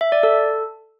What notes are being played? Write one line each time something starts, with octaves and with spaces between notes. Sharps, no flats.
E5
D5
A4